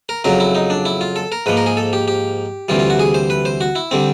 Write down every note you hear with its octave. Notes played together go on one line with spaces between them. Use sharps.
A#4
F2 C#3 F#3 A#4
E4
D#4
D4
E4
F4
A4
A#4
G#2 F3 A#3 B4
A#4
G#4
A4
G4
G4
D2 C3 E3 G3 F4
F4
F#4
G#4
C5
B4
C5
F#4
E4
D3 G3 C4